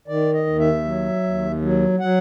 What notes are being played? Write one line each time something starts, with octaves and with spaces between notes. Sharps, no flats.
D#3 D5
D#5
D#2
E5
F#3
D#2
F#3
F#3 F#5